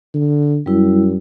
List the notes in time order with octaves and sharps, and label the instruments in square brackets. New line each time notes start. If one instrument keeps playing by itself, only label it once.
[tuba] D3
[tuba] F#2 [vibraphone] G3 E4